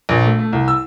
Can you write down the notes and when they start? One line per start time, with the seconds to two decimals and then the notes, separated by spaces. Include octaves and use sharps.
0.09 A#1
0.26 A3
0.39 A3
0.53 C2
0.68 E6